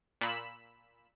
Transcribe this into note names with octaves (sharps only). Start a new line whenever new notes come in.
A#2 B5 E6